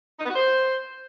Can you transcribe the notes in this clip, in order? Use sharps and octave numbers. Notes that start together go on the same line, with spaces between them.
D#4
B3
F#4
C5